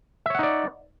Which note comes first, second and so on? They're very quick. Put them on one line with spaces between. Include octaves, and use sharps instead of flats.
E5 C#5 F#5 D#4 D5